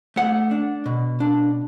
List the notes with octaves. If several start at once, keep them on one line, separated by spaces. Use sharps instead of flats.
A3 F#5
D4
B2
D4